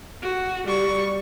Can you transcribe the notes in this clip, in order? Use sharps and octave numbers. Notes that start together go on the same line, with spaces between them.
F#4
G3 C#6